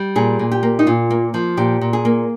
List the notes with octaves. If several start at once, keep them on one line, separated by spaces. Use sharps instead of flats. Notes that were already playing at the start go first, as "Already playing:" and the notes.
Already playing: G3
A#2 G#4
A#2
G4
A#3
D#4
A#2 F4
A#3
F3
A#2 G4
A#2
G#4
A#3